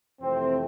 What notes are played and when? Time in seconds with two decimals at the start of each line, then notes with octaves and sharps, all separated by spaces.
0.21 F2 C3 E3 A3 C4